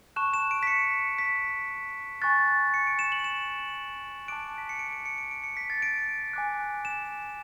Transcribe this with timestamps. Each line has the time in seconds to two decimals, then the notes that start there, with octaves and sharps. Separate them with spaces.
0.16 A5 C#6 F#6 E7
0.34 E7
0.51 D7
0.63 B6
0.67 C#7
1.18 B6
2.22 G#5 C#6 F#6 A6
2.74 C#7
2.87 D7
2.99 E7
3.12 F#7
3.24 E7
4.28 A5 D6 F#6 D7
4.58 B6
4.69 C#7
4.79 D7
4.92 D7
5.05 C#7
5.18 D7
5.31 D7
5.44 C#7
5.57 B6
5.70 A6
5.82 D7
6.33 G#5 D6 F#6
6.85 E7